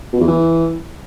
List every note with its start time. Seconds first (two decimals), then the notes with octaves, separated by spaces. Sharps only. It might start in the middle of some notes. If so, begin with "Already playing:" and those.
0.13 B2
0.20 E2
0.28 E3